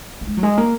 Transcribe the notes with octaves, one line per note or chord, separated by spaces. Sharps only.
A#3
G#3
F#3
G#3
A#3